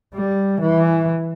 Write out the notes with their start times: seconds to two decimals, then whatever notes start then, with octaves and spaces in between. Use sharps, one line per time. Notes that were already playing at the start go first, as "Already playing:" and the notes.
0.15 G3
0.61 E3